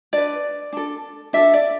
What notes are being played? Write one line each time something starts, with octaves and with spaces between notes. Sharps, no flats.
D4 B4 D5
D4 A4
D4 A4 E5
D5